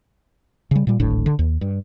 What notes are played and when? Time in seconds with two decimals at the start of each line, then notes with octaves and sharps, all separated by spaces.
0.71 C#3 G3
0.87 A#2 G3
1.00 D1 G#1 A2 D4
1.26 D3
1.39 D#2
1.61 G2